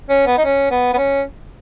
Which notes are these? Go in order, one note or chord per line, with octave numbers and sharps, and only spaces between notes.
C#4
B3
D#4
C#4
B3
B3
C#4